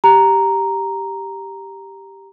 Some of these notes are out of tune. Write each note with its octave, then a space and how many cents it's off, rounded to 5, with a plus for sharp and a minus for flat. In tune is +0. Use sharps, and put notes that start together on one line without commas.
G4 +0 A#5 +0